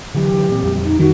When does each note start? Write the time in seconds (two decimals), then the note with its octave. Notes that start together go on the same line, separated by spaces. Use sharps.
0.15 D3 E3 F#3 G4
0.49 A#2 C4
0.63 F2 G3
0.84 D#4
1.00 D#3 F#4